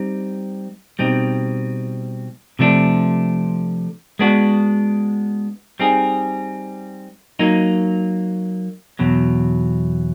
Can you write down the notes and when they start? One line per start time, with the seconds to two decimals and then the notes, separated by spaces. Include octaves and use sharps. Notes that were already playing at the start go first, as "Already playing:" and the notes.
Already playing: G3 C4 D#4
0.99 B2 G3 C4 D#4
2.59 C3 F3 A3 D4
4.19 G#3 B3 D4 F#4
5.80 G3 C4 D#4 G#4
7.39 F#3 A#3 D#4
8.99 E2 B2 F#3